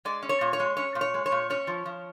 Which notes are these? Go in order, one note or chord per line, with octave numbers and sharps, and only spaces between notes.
G#3 D5
C#4
C#5
A#2
C#5
G#3
C#4 C#5
A#2
C#5
G#3
C#5
A#2
C#4 C#5
F3
F3